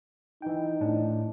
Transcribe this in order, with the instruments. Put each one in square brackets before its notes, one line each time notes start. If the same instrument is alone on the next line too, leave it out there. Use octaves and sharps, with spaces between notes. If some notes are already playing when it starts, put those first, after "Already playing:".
[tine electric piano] E3 G5 [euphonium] D#4
[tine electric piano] A2 D4